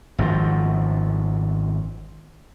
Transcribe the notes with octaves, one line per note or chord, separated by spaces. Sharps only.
G#1 F#2 C#3 F3